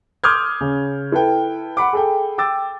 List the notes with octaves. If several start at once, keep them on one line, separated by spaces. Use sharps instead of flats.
C6 D6 D#6 F6 G6 G#6
C#3
E4 A4 B4 G5
F#5 B5 D6
G#4 A4 G5
G5 D6 E6 A6